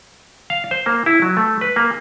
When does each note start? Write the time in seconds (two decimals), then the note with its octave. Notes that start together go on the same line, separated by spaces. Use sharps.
0.50 F5
0.71 C5
0.86 A#3
1.06 E4
1.22 F#3
1.37 A3
1.61 B4
1.76 A#3